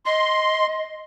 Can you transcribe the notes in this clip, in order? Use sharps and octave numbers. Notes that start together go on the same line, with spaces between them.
D#5 C6